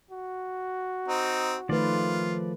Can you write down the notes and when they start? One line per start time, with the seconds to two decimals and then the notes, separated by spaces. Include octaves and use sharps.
0.11 F#4
1.08 C4 D#4
1.69 D#3 F3 A3 F4 B4 D5